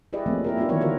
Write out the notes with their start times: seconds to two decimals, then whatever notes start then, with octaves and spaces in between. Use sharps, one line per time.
0.13 E4 G4 G#4 B4 D5 D#5
0.26 F3 A3 A#3 C4 C#4
0.44 E4 G4 A#4
0.57 B3 D4 D#4 F4 G4
0.69 D#3 E3 F#3 E4 A#4 C#5
0.81 D3 F4 F#4 A#4 B4 C#5